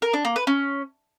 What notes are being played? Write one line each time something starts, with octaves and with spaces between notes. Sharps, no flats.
A#4
D4
A#3
B4
C#4